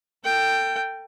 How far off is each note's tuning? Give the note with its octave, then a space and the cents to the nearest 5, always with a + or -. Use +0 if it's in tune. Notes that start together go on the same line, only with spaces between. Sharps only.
A4 +35 G5 +0